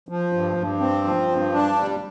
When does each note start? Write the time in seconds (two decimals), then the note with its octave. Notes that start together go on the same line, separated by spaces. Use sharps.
0.09 F3
0.33 G2
0.57 G2
0.80 C4
1.04 F3
1.28 G2
1.52 D4
1.76 G3